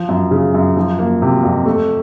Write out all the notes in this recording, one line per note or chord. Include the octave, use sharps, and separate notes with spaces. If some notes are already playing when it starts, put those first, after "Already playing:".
Already playing: F3
F#2
C#3
F#2
F3
A#3
C3
F2
A3